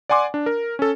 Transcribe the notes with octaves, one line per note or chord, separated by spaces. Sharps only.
D5 F#5 G#5 C6 D6
D4
A#4
C#4 A4